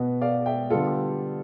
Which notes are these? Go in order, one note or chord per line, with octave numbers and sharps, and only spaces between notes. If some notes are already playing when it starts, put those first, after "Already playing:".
Already playing: B2 B3
D5 F5
E5 G5
D3 G3 B3 F4 A4
G4